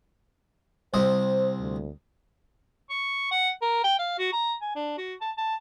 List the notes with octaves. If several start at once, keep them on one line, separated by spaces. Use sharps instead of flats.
C2 C4 C5 D#5
D2
C#6
F#5
A#4
G5
F5
F#4
A#5
G#5
D4
F#4
A5
A5